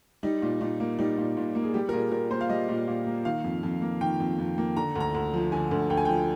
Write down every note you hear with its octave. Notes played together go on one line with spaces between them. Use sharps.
G3 D#4
A#2
A#2 D#4
A#3
G3 D#4
A#2
A#2
A#3
G#4
G3 G4
A#4
A#2 G#4
A#2 A#4
A#3 C5
F5
G3 D#5
A#2
A#2
A#3
D#3 F5
F2
F2
A#3
D#3 G5
F2
F2
A#3
D3 A#5
D2 A#5
D2
F3
D3 G#5
D2
D2 G5
G#5
F3 G5